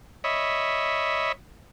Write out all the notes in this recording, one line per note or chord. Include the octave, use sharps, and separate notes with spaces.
C#5 D#5 E5 B5